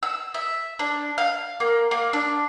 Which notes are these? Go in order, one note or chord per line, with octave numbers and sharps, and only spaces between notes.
E6
E5
D4
F5
A#3
A#3
D4